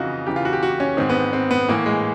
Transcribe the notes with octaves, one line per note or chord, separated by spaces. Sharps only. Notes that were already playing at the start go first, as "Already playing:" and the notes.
Already playing: F2 C#3 E3 D#4 F4 F#4
E2 C#3 E3 G4
F4
F#4
G4
F#4
C#4
G#2 D#3 C4
B3
C4
B3
A2 E3 A#3
G#3